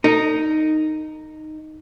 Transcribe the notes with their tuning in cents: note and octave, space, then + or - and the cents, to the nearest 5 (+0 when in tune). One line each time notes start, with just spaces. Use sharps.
D#4 -5 A4 +45